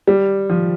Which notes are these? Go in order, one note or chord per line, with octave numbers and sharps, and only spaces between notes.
G3
F3